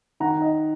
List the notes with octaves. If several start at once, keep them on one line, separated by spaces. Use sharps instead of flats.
D#3 F#5 A#5
D#5